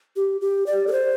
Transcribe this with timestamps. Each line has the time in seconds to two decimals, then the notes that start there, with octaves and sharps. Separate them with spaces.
0.16 G4
0.41 G4
0.66 D5
0.87 A4
0.92 C5